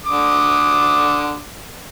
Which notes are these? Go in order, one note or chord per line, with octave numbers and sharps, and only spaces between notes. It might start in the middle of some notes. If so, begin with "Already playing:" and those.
D3 D6 D#6